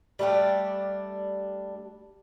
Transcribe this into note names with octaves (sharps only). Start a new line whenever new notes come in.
G3 A3 D4 G4